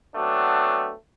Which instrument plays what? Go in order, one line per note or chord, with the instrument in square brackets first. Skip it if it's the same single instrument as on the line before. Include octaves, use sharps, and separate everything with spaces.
[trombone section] F#3 A3 B3 C4 D4